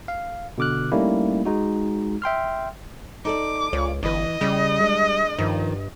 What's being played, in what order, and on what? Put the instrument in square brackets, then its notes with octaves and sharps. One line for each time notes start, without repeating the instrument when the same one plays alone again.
[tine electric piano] F5
B2 D3 D6 F6 F#6
G3 A3 A#3 C#4 D#4 E4
G#3 D#4 F#4
E5 G5 C6 F6
[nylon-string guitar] D#4 A4 D5 [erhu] D6
[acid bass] C#2 [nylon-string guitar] F4 C#5 D5
[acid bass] G1 [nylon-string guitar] E3 B4 [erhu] D#5
[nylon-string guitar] C#3 [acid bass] G3
[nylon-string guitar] G#3 D4
[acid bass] G2 [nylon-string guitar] D#3 F3